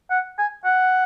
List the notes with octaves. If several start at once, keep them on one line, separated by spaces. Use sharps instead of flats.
F#5
G#5
F#5